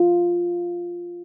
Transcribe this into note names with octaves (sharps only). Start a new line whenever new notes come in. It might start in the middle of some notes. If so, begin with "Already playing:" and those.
Already playing: F4